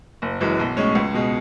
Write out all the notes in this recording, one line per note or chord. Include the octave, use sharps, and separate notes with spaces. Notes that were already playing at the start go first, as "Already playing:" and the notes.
F#1
F#2 E3 G#3
B1
A2 G#3 C#4
C#2
B2 G#3